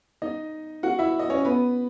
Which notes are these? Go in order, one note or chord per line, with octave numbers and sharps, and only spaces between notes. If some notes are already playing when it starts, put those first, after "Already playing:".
D#4 D#5
F#4 F#5
E4 E5
D#5
C#4 C#5
B3 B4